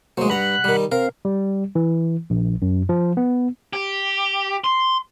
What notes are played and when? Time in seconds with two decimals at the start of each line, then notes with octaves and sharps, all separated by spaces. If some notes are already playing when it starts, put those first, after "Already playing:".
0.18 F#3 G#3 A#3 F#4 C5
0.30 G2 F#5 A#5 B5 F#6
0.64 D#3 G3
0.92 C4 A#4 F5
1.25 G3
1.75 E3
2.30 A#1
2.62 F#2
2.89 F3
3.17 B3
3.73 G4
4.64 C6